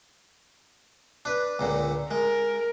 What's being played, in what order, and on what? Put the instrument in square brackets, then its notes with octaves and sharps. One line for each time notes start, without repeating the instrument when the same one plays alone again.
[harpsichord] D4 B4
C#2 A#2 D3
[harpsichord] G#3 [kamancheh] A#4